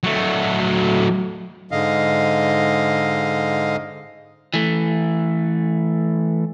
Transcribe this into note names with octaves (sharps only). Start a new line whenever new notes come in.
F#3 A3
G#2 D3 D#5 F5
E3 A3